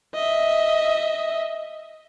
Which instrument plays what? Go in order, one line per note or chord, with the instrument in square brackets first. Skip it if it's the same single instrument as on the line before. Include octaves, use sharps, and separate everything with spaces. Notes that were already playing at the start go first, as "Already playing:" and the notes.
[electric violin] D#5 E5